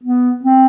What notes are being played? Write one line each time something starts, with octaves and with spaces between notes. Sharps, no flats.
B3
C4